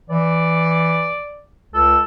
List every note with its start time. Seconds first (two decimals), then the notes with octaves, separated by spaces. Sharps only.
0.10 E3 D5
1.74 C#2 A4